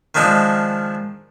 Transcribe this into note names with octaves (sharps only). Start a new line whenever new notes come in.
D#3 F3 G#3 C4 D4